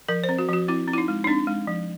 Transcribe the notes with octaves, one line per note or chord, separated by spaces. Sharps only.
F3 A#4
C5
C4
F#4
F3 F#4
C4 E4
C4
E4
D#4
G#3
D#4
C4 D4
G#3
F3